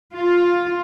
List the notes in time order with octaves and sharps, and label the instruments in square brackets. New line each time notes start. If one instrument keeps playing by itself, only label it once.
[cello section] F4